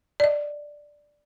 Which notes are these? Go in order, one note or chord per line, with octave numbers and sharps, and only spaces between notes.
D5 D#5